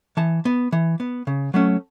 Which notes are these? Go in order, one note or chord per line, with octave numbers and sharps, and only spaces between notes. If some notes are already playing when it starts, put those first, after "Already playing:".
E3 A5
B3
E3
B3
C#3
F#3 A3 C#4